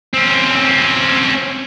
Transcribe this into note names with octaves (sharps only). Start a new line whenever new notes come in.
C4 C#4